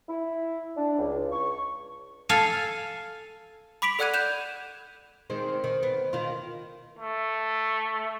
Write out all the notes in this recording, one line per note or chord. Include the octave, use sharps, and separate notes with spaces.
E4
D4
C#2
C#6
A4 F5 G#5
B5 D6 B6 D7 F7 F#7
A4 D5 F#5 F#6 G#6 D#7
F#6 G6 E7 F7
D#3 G#3 C4
D#3
B3
D#3 F4
A3